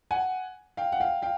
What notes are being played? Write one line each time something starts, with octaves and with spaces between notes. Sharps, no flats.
F#5 G#5
F5 G5
F#5
F5 G5
F5 G5